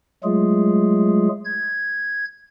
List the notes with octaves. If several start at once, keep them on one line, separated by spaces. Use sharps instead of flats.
F#3 G#3 A3 F4 G#4
G#6